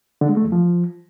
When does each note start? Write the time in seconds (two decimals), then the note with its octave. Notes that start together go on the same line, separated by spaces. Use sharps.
0.21 D3
0.29 G#3
0.37 A3
0.44 E2
0.52 F3